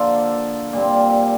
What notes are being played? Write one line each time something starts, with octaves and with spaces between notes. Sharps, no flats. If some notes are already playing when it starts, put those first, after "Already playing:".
Already playing: D3 F3 A#3 A4
A#2 G3 C4